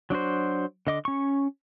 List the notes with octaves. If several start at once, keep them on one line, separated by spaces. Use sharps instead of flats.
F#3 D4 F#4 C5
D3 D#5 D6
C#4 C#6